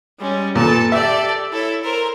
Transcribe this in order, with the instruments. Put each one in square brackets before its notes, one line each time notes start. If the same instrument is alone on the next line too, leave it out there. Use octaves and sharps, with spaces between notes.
[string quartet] G3 G#3 C#4
[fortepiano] A#2 [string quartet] A4 B4 A5
[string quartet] G4 A4 D5 [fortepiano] E5
[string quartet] E4 A4 C#5
A#4 C5